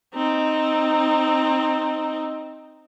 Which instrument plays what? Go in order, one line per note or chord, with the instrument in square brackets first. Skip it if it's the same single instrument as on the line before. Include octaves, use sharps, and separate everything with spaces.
[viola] C4 D#4